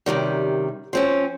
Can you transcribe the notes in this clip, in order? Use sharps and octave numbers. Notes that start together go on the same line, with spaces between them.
F#2 C3 D#3 G3
F3 C4 C#4